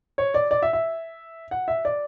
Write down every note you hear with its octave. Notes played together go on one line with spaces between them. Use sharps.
C#5
D5
D5
E5
E5
F#5
E5
D5